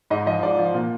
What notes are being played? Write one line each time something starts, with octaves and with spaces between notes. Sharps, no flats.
G#2 D#5
F3 D#5
G#2 D5
F3
A#2